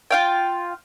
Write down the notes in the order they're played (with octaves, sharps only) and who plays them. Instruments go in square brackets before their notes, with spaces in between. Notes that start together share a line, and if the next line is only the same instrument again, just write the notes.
[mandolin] F4 F5 G5